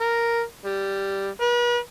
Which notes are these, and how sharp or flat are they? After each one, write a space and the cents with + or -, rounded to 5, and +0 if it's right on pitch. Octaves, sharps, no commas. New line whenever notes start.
A#4 +0
G3 +0
B4 -40